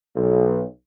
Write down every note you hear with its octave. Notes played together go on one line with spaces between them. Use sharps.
B1